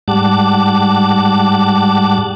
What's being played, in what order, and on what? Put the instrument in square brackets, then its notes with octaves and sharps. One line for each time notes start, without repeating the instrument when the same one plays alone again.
[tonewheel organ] G#2 G3 F#5 A5 D6